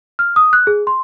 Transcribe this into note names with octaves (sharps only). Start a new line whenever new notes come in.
F6
D#6
F#6
G#4
C6